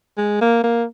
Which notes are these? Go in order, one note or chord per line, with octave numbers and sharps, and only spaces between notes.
G#3
A#3
A#3